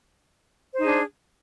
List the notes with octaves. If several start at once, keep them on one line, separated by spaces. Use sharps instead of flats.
D4 D#4 G#4 C5